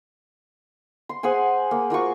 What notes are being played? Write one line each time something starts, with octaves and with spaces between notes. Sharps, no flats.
C6
G#4 C5 F#5 G#5
A#3
A#3 F4 F#4 C#6